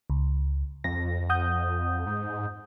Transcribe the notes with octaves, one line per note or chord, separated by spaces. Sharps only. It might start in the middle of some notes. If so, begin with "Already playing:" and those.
C#2
F2 A#6
F#5 D#6 G6
G#2